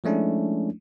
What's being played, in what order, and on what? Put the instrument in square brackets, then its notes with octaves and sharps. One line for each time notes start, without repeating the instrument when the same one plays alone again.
[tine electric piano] F3 G#3 A3 C#4 D4 E4